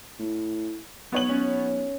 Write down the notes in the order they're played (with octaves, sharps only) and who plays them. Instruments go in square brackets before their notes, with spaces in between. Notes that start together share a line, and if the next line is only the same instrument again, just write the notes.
[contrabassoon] A2
[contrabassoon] B1 [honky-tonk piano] B3 C#5 F#7
[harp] C#4